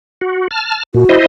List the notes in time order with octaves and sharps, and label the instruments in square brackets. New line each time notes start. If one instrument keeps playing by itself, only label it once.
[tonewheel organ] F#4
A5 F6
[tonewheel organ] A#2 [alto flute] F#4
[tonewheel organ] E4 C5 D#5